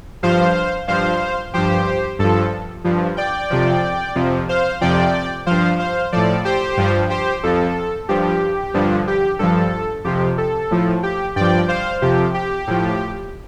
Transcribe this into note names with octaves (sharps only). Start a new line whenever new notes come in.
G2 F3 C5 F5
G2 F3 C5 F5
G2 F3 G4 C5
G2 F3 A4
G2 F3
D5 G5
F2 C3 F3
F2 C3 F3
C5 F5
F2 C3 F3 D5 G5
G2 F3 C5 F5
C5 F5
A2 F3 A4 D5
G4 C5
G2 F3
G4 C5
F2 F3 A4
G2 F3 G4
G2 D3 F3
G4
G2 F3 A4
F2 C3 F3 G4
A4
A2 F3
G4
G2 F3 D5 G5
C5 F5
F2 C3 F3 G4
G4
A2 F3